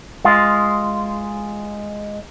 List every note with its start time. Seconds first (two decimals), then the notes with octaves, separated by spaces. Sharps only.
0.25 G#3 F4